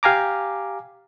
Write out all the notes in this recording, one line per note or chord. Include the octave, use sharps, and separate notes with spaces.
G4 F5 G#5 A#5 D6